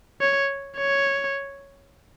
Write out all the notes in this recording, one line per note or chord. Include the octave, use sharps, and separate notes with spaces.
C#5
C#5